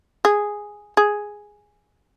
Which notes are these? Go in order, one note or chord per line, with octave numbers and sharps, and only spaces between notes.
G#4
G#4